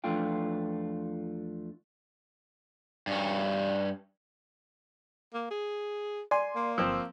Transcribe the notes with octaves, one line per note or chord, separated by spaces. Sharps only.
E2 F3 A3 D4 F4 G5
G2 C#4
A#3
G#4
D5 G#5 C6
A#3
G1 F3 C4 E6